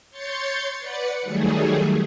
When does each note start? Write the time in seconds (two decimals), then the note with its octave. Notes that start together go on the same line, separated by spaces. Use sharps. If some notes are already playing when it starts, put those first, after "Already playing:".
0.10 C#5 C6 G6 A6 C#7
0.79 B4 D5 F#5 C#7
1.22 D#3 F#3 G3 A3 G#4